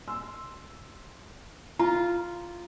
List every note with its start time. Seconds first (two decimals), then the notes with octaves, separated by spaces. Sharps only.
0.08 C6 E6
1.79 F4 A#5